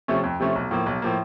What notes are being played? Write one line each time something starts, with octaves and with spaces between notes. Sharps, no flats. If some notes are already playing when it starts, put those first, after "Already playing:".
C3 F3 A3 C#4
F2
C3 F3 A3 C#4
B1
A2 F3 A#3
B1
A2 F3 A#3